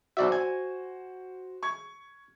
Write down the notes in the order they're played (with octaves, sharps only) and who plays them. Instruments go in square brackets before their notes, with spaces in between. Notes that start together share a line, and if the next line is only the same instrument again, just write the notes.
[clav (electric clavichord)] B1 D5 E5 [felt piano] F#4 C5
[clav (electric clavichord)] G#5
[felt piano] C#6 G#6